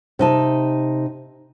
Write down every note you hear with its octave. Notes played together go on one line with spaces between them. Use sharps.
C3 D#4 A5